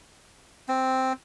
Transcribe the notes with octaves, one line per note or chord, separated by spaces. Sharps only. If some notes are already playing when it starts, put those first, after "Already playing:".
C4